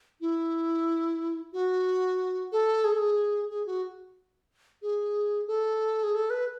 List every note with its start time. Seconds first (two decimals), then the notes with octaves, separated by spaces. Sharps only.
0.21 E4
1.53 F#4
2.52 A4
2.84 G#4
2.92 A4
2.98 G#4
3.50 G#4
3.66 F#4
4.82 G#4
5.48 A4
6.03 G#4
6.15 A4
6.30 B4